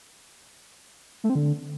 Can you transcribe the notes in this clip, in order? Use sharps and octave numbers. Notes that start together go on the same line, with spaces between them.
A3
C4
D3